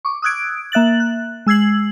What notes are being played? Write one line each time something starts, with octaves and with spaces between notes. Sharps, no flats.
C#6 D6
D#6 E6 F#6 G#6 D7
A#3 E5 F#6 A6 F#7
F#6
G#3 E6 G#6 C7 F#7